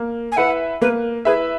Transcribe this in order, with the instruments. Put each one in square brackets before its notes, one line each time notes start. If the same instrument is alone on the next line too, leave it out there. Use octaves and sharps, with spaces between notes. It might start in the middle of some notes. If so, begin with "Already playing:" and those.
Already playing: [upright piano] A#3
[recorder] G#5
[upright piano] E4 B4 E5 [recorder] F#5
[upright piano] A#3 [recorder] B4
[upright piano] E4 B4 E5 [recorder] G#4